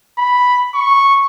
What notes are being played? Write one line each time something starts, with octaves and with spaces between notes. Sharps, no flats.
B5
C#6